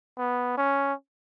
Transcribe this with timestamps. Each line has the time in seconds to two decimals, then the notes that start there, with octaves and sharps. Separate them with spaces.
0.18 B3
0.58 C#4